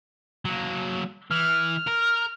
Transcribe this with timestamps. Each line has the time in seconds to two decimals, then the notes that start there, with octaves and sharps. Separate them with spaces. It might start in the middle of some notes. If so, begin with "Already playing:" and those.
0.45 F#3 A#3
1.31 E3 F6
1.87 A#4